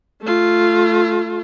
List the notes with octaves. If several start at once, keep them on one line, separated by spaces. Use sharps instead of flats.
A3 F4